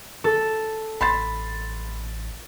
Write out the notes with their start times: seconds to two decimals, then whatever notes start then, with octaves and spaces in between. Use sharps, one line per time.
0.24 A4
1.01 A1 B5 C6 A6